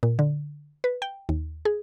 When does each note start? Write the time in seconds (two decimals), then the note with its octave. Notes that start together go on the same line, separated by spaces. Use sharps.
0.03 A#2
0.19 D3
0.84 B4
1.02 G5
1.29 D#2
1.65 G#4